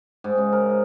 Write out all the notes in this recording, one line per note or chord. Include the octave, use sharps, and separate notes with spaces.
G#2
C#3
A#4
D#5